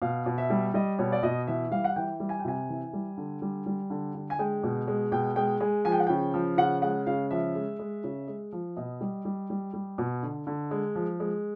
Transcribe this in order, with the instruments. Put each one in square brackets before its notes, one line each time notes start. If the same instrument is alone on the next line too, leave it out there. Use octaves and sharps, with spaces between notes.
[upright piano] B2 F5
B2
E5
G3
G3 D#5
B2 C#5
D5
B2 D#5
E3 E5
G3 F5
F#5
E3 G5
G3
G#5
G5
C3 G#5
E3
G3
D3
G3
G3
D3
D3
G#5
G#3 G5
B2
G#3
B2 G5
G#3 G5
G#3 G#5
F3 G#5
G5
F#5
C#3 G5
F3
C#3 F#5
G#3 F#5
C#3 F5
F3 E5
G#3
G#3
C#3
G#3
F3
B2 D#5
G3
G3
G3
G3
B2
D3
D3
G#3
F3
G#3